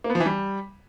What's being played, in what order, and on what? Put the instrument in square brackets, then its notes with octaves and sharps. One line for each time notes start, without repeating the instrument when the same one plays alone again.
[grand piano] A#3
B3
F3
E3
G3